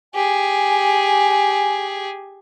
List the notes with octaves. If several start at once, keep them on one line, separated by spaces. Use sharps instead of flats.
G4 G#4 G#5